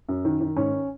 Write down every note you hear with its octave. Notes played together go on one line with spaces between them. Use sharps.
F#2
D#3
D#3
G#2 C#4